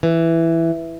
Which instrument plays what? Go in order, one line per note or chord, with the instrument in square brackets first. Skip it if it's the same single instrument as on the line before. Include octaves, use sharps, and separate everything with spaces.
[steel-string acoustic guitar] E3